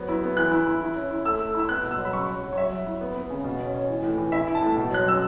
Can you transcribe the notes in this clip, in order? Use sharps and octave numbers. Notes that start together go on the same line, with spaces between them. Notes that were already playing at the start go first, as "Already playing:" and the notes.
Already playing: F#3 B3
E4
B3
E3 F#6
E4
E4
E4
C#4
E4
A3 E6
A3
E4 E6
B3 F#6
B2
E6
F#3
B5
C#3 C#6
F#3
F#3
C#5
F#3 E5
F#3
E4
B3
B3
C#3
B2
C#4
C#4
E3
A2
E3
E4 E5
E4
A5
A2
B2
F#3 F#6
C#4 E6